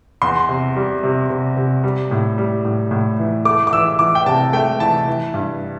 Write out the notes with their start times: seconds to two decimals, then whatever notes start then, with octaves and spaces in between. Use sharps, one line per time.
0.22 E2 C6
0.49 C3
0.76 G3
1.04 C3
1.30 C3
1.57 C3
1.83 G3
2.11 A2
2.38 G3
2.65 A2
2.91 A2
3.19 E3
3.45 A3 D6
3.67 D6
3.73 E3 E6
3.99 E3 D6
4.15 G5
4.26 C3 A5
4.53 A3 G5
4.80 E3 A5
5.08 E3
5.34 G2